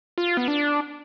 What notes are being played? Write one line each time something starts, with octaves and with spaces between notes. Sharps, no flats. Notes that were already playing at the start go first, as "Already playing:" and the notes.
F4
B3
D4